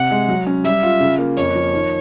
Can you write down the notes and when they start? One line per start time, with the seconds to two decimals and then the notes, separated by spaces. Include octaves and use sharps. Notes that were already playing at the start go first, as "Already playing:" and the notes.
Already playing: C3 F#5
0.11 G#3
0.28 F#3
0.47 C#4
0.64 G3 E5
0.83 F4
1.00 C#3
1.19 A#3
1.37 F2 C#5
1.55 F3
1.74 D#3